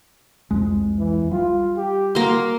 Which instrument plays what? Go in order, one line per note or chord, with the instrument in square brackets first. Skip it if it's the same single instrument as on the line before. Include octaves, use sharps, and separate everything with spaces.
[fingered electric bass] C2 F2 G#3
[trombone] E3
[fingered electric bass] G3 [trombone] F4
[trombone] G4
[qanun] A#3 C6 [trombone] F#4